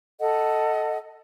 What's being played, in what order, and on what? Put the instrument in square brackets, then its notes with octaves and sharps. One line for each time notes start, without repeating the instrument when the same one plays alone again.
[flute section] A4 D#5 F#5